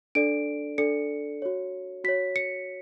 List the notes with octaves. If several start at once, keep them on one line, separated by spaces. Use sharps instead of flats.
D4 A4 D5 D7
D4 A4 D5 C#7
F#4 C#5
F#4 C#5 B6
C#7